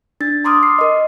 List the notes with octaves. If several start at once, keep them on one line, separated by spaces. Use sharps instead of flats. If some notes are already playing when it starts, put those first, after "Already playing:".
D4 A6
A#5 C6 D6 D#6 F6
C7
A#4 D#5